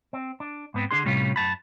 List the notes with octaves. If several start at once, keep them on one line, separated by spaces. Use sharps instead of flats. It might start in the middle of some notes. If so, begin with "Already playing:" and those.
C4
D4
G#2 B3 C4
D3 D4 G#4 C6
A2 C3 G3 C#4 D#4 F4
F#2 A5 B5